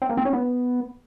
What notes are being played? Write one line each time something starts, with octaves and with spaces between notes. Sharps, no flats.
C4
A#3
C4
C#4
B3